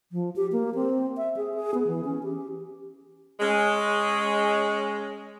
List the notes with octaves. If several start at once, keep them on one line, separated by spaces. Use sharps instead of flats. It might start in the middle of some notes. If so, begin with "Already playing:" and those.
F3
G4
A#3
C4
E5
G#4
G#4
B3
E3
C#4
G4
G#3 C#4